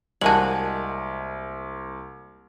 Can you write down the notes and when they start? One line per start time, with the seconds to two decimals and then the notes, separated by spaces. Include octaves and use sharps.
0.21 C2 G#3 A#3 F#4 A5 F#7